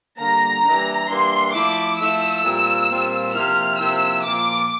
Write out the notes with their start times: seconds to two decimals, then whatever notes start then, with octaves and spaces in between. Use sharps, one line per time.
0.18 D3 G3 A#3 A#5
0.63 E3 G3 A#3 D4
1.08 E3 G3 A#3 D4 C6
1.53 F3 A3 E4 D6
1.98 F3 A3 E4 E6
2.43 A#2 G3 C4 F4
2.89 A#2 G3 C4 F4
3.33 C3 F3 A#3 E4 F6
3.79 C3 F3 A#3 E4 E6
4.23 A#2 F3 A#3 F4 D6